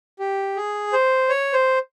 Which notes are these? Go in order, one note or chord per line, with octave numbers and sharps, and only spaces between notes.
G4
G#4
C5
C#5
C5